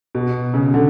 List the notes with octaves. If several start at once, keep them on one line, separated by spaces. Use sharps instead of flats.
B2
C#3
D3